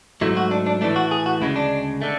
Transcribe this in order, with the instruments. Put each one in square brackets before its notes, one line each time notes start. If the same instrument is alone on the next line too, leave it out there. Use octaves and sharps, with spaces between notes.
[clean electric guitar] G#2 F#3 A3 E4
F#4
D4
D4
A2 E3 A3 D4
F#4
G#4
F#4
D2 C#3 G#3 E4
D4
D3 A3